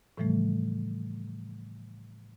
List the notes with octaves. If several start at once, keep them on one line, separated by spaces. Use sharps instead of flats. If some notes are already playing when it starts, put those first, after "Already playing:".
A2 C#3 E3 F3 G3 A3